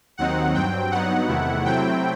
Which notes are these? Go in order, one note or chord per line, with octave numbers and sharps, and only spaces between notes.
D#2 D#3 F#3 C4 D#4 F#5
G2 F#3 C4 G5
G2 F#3 B3 D#4 F#5
E2 C3 D#3 A3 E4
C3 F#3 A3 C4 E4 G5